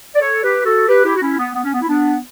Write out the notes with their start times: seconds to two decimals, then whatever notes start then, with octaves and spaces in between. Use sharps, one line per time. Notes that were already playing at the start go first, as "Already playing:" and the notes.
0.15 D5
0.21 A4 C#5
0.43 G4 B4
0.65 F#4 A4
0.88 G4 B4
1.05 E4 G4
1.16 F#4
1.22 C#4 E4
1.38 B3
1.55 B3
1.64 C#4
1.74 B3
1.82 E4
1.89 B3 D4